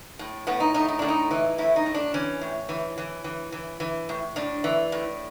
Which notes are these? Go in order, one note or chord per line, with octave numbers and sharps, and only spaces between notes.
A2
A2 B3
D#4
A2 D#4
D#4
A2 D4
D#4
E3
A2 E4
D#4
A2
D4
E3 C#4
A2
E3
E3
E3
E3
E3
A2
A2 D4
E3
A2